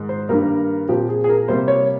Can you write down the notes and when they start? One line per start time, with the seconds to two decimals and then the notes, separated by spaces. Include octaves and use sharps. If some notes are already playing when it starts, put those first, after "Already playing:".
Already playing: G#2 D#3 G#3
0.09 C5
0.29 G2 D#3 G3 A#3 A#4
0.89 A#2 F3 C4 G4
1.09 G#4
1.24 G#4
1.29 A#4
1.48 C3 G3 A#3 C5
1.68 C#5